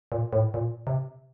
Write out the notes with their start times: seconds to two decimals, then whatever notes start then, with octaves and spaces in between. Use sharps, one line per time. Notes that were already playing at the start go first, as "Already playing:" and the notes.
0.12 A#2
0.33 A2
0.54 A#2
0.87 C3